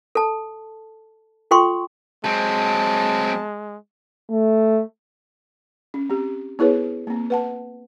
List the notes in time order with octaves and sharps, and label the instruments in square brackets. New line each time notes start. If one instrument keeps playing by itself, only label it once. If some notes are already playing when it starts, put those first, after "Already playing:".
[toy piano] A4 A5
F4 A4 G5 C6 C#6
[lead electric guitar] F#3 C4 [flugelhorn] G#3 [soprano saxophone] A5
[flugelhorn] A3
[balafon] C#4
C4 G4
B3 E4 G#4 B4 C#5
A#3 C4
B4 F#5 A5